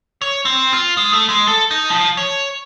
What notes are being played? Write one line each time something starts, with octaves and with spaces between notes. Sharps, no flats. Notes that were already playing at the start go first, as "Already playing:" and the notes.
C#5
C4
F4
G#3
A3
G#3
A4
D#4
F3
C#5